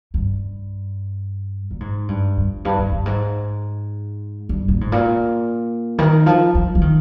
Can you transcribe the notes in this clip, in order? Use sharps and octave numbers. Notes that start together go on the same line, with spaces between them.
G2
A#2
G#2
G2
F2
G2
G2
G2
G#2
G2
A#2
G#2
A#2
D#3
F3
F3
F3
D#3